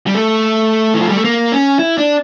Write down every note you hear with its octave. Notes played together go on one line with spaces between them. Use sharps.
G3
A3
E3
F3
G3
A3
A#3
C#4
E4
D4